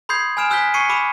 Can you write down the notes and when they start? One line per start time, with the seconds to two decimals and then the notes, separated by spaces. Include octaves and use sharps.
0.09 B5 C6 D#6 G6 G#6 C7
0.37 G#5 B5 F6 D7 E7
0.50 G#5 E6 F#6 G6 B6 G7
0.74 C#6 G#6 C7 C#7 D#7
0.89 B5 D6 E6 E7